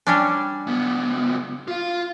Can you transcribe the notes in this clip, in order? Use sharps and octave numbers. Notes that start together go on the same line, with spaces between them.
G3 C#4 D4
C#2 B3
F4 F5